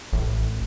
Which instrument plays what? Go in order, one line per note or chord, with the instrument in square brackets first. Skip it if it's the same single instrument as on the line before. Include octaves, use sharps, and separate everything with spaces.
[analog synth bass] A1